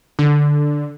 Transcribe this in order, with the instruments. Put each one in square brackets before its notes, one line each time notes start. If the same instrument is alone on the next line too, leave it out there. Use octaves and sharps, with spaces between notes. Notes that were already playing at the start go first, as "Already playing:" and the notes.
[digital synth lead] D3